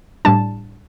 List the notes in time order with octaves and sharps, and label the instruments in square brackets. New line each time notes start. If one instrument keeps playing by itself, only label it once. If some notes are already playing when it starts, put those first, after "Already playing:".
[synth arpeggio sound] A2 G3 D4 A5